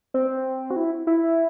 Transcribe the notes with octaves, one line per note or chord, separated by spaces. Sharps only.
C4
F#4
E4
E4